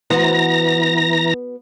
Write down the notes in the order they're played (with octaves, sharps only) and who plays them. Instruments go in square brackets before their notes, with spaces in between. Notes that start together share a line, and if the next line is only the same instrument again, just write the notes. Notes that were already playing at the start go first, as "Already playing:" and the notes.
[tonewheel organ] E3 A#5 A#6 [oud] B3 F#4 C5